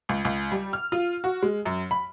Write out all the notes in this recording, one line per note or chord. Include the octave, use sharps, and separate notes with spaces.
C#2
C#2
G3
F6
F4
F#4
G#3
F#2
B5